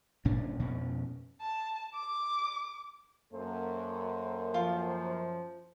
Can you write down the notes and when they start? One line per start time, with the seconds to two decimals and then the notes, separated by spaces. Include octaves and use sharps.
0.25 G1 A#2 C#4 D4
0.60 F2 B2 C#4
1.41 A5
1.94 D6
3.33 F#2 A#3 A4 C5
4.54 F3 F4